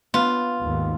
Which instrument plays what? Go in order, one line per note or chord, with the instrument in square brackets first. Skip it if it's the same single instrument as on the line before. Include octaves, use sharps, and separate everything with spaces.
[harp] B3 [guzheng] F4
[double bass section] G#1 D#2